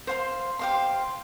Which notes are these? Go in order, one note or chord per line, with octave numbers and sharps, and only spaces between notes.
C5 F5 C6
G4 C5 F5 C6